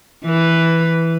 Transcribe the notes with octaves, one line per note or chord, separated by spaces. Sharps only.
E3 B4